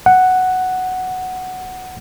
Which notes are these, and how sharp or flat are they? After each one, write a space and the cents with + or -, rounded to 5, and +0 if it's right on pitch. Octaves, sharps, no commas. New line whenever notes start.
F#5 +5